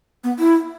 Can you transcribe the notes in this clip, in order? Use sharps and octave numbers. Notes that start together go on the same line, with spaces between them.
B3
E4